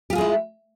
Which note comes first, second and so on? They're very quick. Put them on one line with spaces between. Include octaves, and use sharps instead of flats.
G4 F4 G#4 G#3 E4